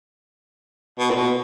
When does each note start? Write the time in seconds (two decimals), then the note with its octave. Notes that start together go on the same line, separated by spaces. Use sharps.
0.99 B2
1.10 A#2
1.15 B2